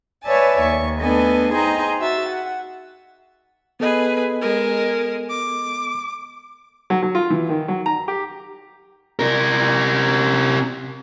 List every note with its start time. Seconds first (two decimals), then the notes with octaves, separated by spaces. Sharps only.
0.24 B4 C#5 D5 E5 G#5 A5
0.61 D#2 C#6
1.00 A3 B3 D4 A4 D#5 G#5
1.53 D#4 G#4 C5 D#5 G5 A#5
1.99 F#4 E5 A6
2.29 F#5
3.80 B3 G#4 A4 B4 D#5
4.41 G#3 A#4
5.29 D6
6.90 F#3
7.02 F#3
7.15 F4
7.30 E3
7.49 D#3
7.68 F#3
7.86 A#5
8.08 G4
9.19 C3 A#4